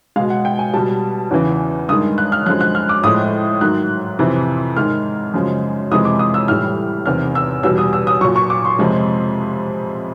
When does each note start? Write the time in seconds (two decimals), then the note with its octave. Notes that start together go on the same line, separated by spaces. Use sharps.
0.16 G#3 F5
0.19 B2
0.30 F#5
0.45 G5
0.59 G#5
0.74 B2 G3 A5
1.31 E2 C#3 E3
1.89 G2 D#3 G#3 D#6
2.18 F#6
2.32 F6
2.46 F#2 D3 F3 G#3 F#6
2.61 F#6
2.75 F6
2.89 D6
3.04 A2 F3 G#3 D#6
3.61 G#2 D#3 F#3 F#6
4.19 F2 C3 E3
4.76 G#2 D#3 G#3 F6
5.34 F#2 C#3 F3 G#3
5.91 F2 C3 E3 G#3 D#6
6.05 D6
6.19 D#6
6.34 E6
6.48 A2 E3 G3 F6
7.06 E2 C3 D#3 F6
7.35 E6
7.63 E2 B2 G3 E6
7.78 D#6
7.93 E6
8.07 D#6
8.21 F#3 C#6
8.24 A#2
8.36 C#6
8.50 D6
8.65 C6
8.79 F2 C3 F3 G#3